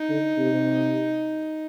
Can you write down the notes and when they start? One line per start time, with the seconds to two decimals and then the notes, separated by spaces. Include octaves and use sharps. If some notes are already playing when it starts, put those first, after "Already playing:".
Already playing: D#4
0.09 D3
0.38 C3